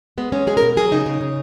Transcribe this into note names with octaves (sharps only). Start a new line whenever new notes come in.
G#3 B3
G#3 C#4
G#3 G#4
B2 A#4
F#3 G#4
C#3 D#4
C#3
C#3